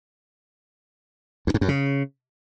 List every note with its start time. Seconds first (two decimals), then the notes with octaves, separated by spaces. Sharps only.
1.47 E2
1.54 G#2
1.61 F#2
1.68 C#3